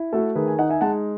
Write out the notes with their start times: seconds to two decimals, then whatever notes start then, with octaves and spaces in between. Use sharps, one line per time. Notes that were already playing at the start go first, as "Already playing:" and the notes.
Already playing: E4
0.13 A3 F#4 A4
0.35 D#3 G#4 B4
0.48 G#5
0.59 D#4 D#5 F#5
0.69 E5 G#5
0.81 G#3 F#5 A5